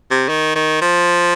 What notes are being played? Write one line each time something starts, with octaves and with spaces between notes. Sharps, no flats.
C3
D#3
D#3
F3